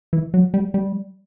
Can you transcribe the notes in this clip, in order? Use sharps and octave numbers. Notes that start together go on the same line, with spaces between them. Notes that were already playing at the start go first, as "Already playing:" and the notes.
E3
F#3
G3
G3